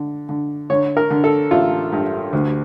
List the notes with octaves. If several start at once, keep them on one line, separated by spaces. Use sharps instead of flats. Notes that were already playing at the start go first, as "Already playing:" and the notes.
Already playing: D3
D3
D3 C#5
A#4
D3
A4
A1 F4
G2
D2